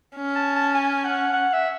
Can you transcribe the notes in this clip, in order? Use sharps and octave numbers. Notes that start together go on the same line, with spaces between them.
C#4
A5
A5
G#5
F#5
F#5
E5